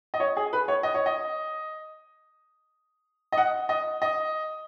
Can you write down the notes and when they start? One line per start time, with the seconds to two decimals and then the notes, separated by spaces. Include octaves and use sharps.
0.14 D#5
0.20 C#5
0.37 G#4
0.53 B4
0.68 C#5
0.83 D#5
0.94 C#5
1.06 D#5
3.32 D#5
3.37 F#5
3.69 D#5
4.02 D#5